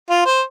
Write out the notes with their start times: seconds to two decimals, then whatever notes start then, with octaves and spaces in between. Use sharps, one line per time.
0.10 F4
0.25 C5